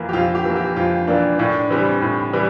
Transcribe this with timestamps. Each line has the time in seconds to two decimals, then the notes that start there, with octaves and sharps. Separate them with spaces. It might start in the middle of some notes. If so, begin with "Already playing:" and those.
Already playing: F2 E3 A#3
0.09 G4
0.13 F2 F4
0.35 G4
0.45 E3 A#3
0.56 G4
0.76 F2 F4
1.07 E3 A#3 D4
1.39 A2 D4
1.71 E3 G3 C4
2.02 A2
2.33 E3 G3